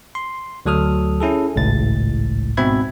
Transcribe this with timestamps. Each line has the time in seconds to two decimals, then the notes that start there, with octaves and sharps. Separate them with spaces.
0.15 C6
0.66 D2 F#3 A4 D#6 F6
1.20 C#4 E4 G#4 A4
1.56 G#1 C#2 A2 A6
2.57 G#2 B2 C4 E5 B5 G#6